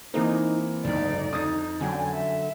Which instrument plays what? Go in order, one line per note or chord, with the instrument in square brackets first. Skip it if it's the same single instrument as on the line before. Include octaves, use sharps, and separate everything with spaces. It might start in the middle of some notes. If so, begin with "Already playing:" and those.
[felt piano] E3 A#3 C4 [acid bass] D#4
[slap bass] F#1 G#2 [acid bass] D2 [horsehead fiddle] D#4 D5
[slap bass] F2 [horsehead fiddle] D#4 [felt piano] D#6 A6
[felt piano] F#2 F#3 [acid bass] D3 [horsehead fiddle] G5 G#5
[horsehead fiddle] E5